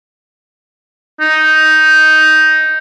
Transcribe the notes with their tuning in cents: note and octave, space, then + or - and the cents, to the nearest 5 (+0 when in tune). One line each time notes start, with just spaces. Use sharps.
D#4 +5